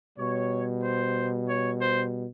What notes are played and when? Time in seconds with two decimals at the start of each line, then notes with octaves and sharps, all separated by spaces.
0.18 B2 G3 C#5
0.83 C5
1.49 C#5
1.81 C5